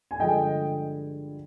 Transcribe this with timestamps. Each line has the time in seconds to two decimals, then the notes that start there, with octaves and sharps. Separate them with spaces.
0.11 G#5
0.20 G2 D3 F3 G#3 D#5 G5